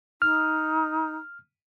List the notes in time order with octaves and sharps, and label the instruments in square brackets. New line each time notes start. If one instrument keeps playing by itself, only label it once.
[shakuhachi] D#4 [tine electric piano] F6